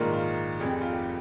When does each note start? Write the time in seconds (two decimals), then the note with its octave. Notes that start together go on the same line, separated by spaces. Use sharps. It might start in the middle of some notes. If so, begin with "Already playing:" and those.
Already playing: A#1 G#2 D#3 A#3 F4
0.12 F4
0.60 F1 F2 C3 G#4
0.70 G4
0.81 F4
0.92 G4